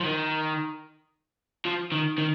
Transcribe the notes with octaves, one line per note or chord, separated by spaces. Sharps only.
F3
D#3
F3
D#3
D#3